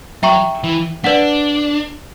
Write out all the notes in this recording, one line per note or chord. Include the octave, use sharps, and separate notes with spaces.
F#3 E5 G5 A#5 C#6
E3
D4 B4 D5 F#5